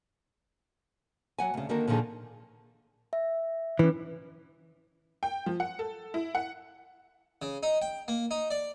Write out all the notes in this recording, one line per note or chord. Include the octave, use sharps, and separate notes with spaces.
F#3 F#5 G#5
D2 C#3
D3 D#3 A#3 F#4 A#4
A#2 D3 D#3 F3 D4 G#4
E5
E3 C#4 B4
G5
F3
F#5
A4
E4
F#5
C#3
D#4
G5
A#3
D#4
D5